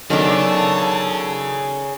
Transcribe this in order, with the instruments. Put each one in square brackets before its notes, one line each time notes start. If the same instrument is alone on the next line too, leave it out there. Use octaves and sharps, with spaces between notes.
[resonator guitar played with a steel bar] D#3 B3 D4 [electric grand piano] F#3 A4 [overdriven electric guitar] G#4 C#5 [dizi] A5